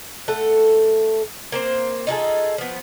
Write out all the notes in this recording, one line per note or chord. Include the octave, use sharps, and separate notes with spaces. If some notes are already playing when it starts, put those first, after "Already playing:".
A3 A4 F#5
A#3 C4 C5
D#4 F4 G#4 A4
F3 B3